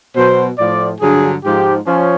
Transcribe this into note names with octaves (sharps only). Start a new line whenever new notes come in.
B2 F#3 C5
A2 F3 D5
G2 D3 F#3 G#4
G#2 F3 G4
F3 C#4